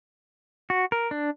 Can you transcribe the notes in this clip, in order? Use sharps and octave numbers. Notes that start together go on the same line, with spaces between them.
F#4
A#4
D4